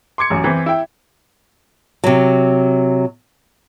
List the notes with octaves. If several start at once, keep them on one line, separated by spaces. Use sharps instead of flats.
C6 D6 G#6 C#7
A1 F#2
E3 C4
E4 G5
C3 F#3